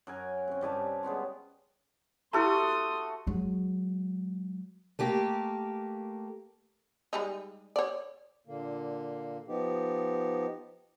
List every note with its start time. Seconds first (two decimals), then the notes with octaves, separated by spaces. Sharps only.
0.07 F#2 A#4 G#5
0.48 C3 C#4
0.61 G2 G3 G#5 A5
1.03 G#3 B3 C#4 F4
2.33 A3 E4 F#4 G4 A4 A#5 C6 D#6
3.27 F#3 G#3
4.99 A3 A#3 G4
7.13 G3 G#3 D#4
7.76 C#5 D5
8.47 A#2 D3 A#3
9.47 F3 B3 D#4 G4